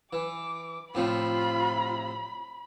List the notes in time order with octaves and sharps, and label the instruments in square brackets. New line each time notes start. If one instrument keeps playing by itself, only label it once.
[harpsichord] E3 [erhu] D6
[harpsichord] A2 C3 F3 [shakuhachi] F4 [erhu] B5